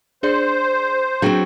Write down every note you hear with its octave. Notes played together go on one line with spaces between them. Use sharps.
D4 G#4 C5 D5
F#3 C4 D4 G#4 G5